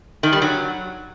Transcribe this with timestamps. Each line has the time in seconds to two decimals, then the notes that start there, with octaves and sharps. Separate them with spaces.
0.23 D#3
0.32 G3
0.42 F#3